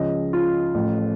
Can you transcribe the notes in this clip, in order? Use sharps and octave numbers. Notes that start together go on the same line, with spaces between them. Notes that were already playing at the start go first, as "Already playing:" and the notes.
Already playing: C#2 C#3 F3 D#5
F4
A1 A2 F3 A3